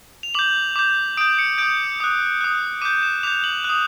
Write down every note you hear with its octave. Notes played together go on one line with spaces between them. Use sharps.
F7
D6 G6 F#7
D6 G6
D#6 G6 D7
C#7
D#6 G6 D7
D#6 F#6
D#6 F#6
D6 G6 D#7
E7
D6 G6 F7
F#7
D#6 F#6